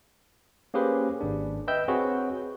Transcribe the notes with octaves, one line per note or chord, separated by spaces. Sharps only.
A#3 C#4 G4 G#4 B4 C5
G#1 D4
B4 D#5 E5 G5 E6 G6
C4 F#4 G#4 B4 C#5